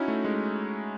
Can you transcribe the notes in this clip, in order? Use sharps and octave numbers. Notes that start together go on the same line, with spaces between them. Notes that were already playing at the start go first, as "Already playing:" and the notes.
Already playing: C#4 D#4 E4 F#4
A3
G#3